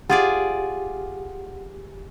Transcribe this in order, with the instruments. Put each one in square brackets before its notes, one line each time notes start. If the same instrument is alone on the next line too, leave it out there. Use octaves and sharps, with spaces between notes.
[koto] F4 G#4 D5 [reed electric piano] G4 [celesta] F#5